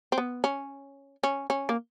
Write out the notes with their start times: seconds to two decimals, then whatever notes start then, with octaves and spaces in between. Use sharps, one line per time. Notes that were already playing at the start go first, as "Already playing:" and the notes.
0.12 C4
0.18 B3
0.44 C#4
1.24 C#4
1.50 C#4
1.69 A#3